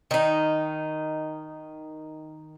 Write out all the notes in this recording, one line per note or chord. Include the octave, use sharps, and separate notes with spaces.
D#3 D#4